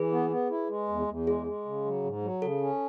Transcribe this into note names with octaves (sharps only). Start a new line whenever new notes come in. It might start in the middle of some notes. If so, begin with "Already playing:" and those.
Already playing: E3 G#4 B4
B3
B3
E4
G#3
E2
E2
G#3 G#4
G#3
C#3
F#3
G#2
F#3
C#3 A4
C#4